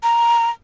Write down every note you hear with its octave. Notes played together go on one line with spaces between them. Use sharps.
A#5